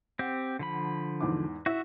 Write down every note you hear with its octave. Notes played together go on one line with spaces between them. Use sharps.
C4 G4 F#5
D3 F3 B5
E2 G#2 D6
E4 F#4 E5